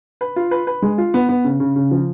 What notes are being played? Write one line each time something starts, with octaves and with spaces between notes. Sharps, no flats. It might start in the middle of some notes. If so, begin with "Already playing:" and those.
B4
F4
B4
B4
G#3
F4
B3
B3
C#3
C#3
C#3
F3